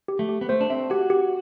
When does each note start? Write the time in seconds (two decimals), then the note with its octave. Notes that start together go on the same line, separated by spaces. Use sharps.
0.08 G4
0.19 A3
0.29 G4
0.41 B3
0.49 A3 C5
0.61 D4
0.70 C4 E5
0.90 F#4 G4
1.10 G4